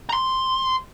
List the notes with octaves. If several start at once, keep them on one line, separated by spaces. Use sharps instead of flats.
A#5 C6